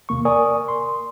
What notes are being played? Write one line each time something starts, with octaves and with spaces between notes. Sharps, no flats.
D#2 C3 A#3 C#6
A#4 D5 G#5 C#6 D#6
C6